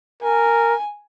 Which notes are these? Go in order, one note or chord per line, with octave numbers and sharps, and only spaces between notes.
A#4 G#5